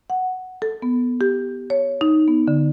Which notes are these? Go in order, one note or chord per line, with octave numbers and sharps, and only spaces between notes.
F#5
A4
B3
G4
C#5
D#4
B3
D3